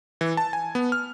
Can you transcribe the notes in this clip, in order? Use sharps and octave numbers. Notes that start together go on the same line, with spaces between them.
E3
A5
G#5
B3
F6